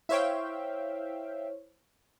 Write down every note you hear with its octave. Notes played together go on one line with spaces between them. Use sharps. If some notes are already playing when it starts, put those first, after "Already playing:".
E4 C5 C#5 E5 F5 G5